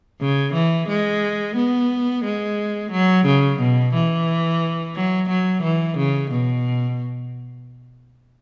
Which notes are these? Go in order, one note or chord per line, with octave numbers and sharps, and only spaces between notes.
C#3
E3
G#3
B3
G#3
F#3
C#3
B2
E3
F#3
F#3
E3
C#3
B2